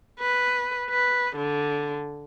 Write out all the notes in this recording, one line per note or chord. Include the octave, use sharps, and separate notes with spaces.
B4
B4
D3